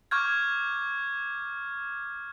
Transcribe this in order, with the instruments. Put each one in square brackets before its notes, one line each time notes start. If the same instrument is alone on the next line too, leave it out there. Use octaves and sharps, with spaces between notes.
[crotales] C#6 D6 F6 G6 G#6